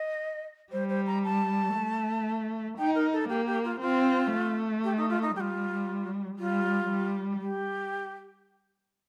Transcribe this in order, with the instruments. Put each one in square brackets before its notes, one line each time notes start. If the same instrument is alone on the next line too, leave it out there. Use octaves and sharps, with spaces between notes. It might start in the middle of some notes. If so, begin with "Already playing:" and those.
Already playing: [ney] D#5
[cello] G3 [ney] C5
[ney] C5
A#5
A5
[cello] A3
[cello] D#4 [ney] G5
[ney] A#4
A4
[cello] A#3 [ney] G4
[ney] G4
F4
[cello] C4 [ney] F4
[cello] A3
[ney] G4
D#4
F4
D#4
[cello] G3 [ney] G4
[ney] F4
[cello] G3 [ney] F4
[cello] G3
[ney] G4